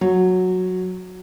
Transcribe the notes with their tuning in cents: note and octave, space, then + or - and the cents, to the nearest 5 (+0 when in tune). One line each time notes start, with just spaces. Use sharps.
F#3 -10